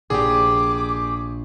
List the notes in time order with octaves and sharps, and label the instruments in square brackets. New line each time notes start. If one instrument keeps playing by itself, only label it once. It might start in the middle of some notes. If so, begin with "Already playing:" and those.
[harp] A#1 [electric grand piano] G4 G#4 [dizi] D6